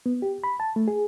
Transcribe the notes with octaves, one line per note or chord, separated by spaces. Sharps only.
B3
G4
B5
A5
A3
G#4